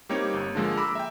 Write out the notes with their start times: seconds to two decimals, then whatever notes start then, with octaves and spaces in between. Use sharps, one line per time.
0.09 G3 A#3 C4 D#4 G4 C#5
0.34 G1
0.55 D3 F3 G#3 A#3 A4
0.77 A#5 B5 D6 E6
0.95 E5 G5